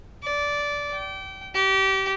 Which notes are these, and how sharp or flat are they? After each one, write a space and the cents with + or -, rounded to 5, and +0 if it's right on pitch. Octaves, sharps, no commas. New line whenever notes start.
D5 -15
G5 -30
G4 -25